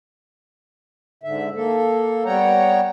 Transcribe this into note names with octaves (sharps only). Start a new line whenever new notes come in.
G#2 D3 E5
A#3 A4
G3 B3 C#5 F#5 G5 A#5